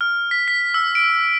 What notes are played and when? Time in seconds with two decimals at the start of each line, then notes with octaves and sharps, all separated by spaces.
0.01 F6
0.31 B6
0.48 B6
0.74 E6
0.95 D7